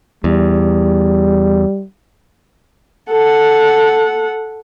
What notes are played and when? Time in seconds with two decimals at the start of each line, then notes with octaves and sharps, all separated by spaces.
0.24 E2 G3
3.09 A4 F#5